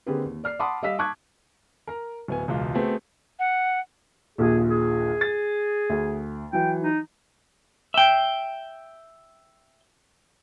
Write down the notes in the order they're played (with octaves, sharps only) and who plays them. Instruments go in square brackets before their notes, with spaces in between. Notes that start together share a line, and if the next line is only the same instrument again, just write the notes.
[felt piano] D3 A#3 C4 G4 G#4 B4
D#2
D5 F6 C7
F#5 A5 B5 C6 D6 D#6
G3 D#5 F5 E6 B6
A5 C#6 D6 F#6 G#6
[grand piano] A#4 A#5
D1 B3 G#5
E1 C#2 F4
A3 B3 C4 F#4 G#4
[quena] F#5
[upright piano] A#1 D#2 A#2 [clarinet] G#4
[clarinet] G#4
[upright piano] A6
D2
[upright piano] E3 F#3 [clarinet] G5
[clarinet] D#4
[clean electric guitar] E5 G5